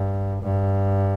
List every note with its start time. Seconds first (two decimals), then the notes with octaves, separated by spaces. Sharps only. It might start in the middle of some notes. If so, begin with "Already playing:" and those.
Already playing: G2
0.43 G2